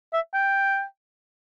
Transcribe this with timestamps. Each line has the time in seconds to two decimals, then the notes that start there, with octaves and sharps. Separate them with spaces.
0.13 E5
0.34 G5